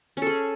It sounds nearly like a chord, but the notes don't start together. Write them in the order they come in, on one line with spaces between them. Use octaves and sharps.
C#4 A4 G#4